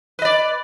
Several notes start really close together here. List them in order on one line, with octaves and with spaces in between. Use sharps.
B4 D#5 D5